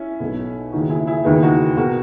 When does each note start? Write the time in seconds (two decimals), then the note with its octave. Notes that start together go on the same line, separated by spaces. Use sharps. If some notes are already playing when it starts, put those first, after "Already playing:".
Already playing: C#4 E4
0.20 B1 B2
0.72 D#2 C#3 E3 D#4 F#4
0.90 E4 G#4
1.07 E4 G#4
1.25 E1 D#2 C#3 E3 B3 D#4
1.43 D#4 F#4
1.77 B2 F#4 A#4